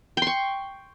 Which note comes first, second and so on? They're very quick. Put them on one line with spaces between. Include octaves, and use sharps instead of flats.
G5 C6 C#6